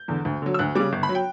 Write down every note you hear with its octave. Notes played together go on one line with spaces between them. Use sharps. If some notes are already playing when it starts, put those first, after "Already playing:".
Already playing: G6
E2 D3
D2
D3 F#3
E6
D2 F#6
C#3 G3 D6
G1
B5
F#3
G5